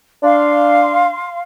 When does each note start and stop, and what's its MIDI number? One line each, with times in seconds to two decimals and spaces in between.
0.23 1.13 62
0.23 1.41 77
0.23 1.41 84